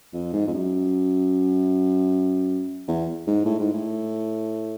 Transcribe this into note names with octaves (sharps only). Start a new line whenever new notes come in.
F2
G#2
F2
F#2
E2
G#2
A2
G#2
A2